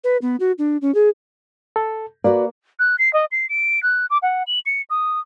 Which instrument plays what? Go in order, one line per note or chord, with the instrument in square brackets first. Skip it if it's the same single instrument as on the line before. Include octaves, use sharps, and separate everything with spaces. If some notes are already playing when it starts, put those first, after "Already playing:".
[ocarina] B4
B3
F#4
D4
C#4
G#4
[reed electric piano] A4
[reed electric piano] A#3 [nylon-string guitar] F#4 B4 D5
[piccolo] F#6
C7
D#5
C7
D7
F#6
D6
F#5
F#7
C#7
D#6